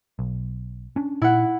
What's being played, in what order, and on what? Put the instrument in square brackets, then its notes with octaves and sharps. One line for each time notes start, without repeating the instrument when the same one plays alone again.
[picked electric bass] B1
C#4 D4
[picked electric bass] A#2 [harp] E4 F#5